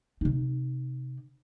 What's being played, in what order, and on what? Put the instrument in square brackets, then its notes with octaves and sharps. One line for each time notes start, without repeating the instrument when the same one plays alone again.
[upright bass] C3 D#4